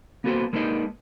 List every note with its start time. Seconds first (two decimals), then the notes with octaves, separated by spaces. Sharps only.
0.24 A#3 B3 F#4 A4 B4 C5
0.53 G#3 A#3 D4 D#4 B4 D#5